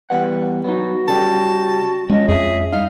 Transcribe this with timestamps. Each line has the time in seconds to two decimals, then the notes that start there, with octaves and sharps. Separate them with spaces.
0.10 E2 G3 B4 F#5
0.64 F#3 B3 D#4 F#4
1.08 C#3 G3 G4 A5
2.10 F3 G#3 C#4 D#5
2.28 F2 G#4 E5
2.73 G3 D#4 F5